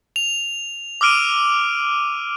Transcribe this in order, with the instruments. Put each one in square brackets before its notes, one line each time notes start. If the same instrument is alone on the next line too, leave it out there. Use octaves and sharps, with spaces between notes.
[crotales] F7
D6 E6 F6 D7 D#7